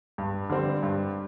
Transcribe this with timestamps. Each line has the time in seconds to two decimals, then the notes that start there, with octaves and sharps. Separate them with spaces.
0.18 G2
0.50 D3 G3 C4
0.82 G2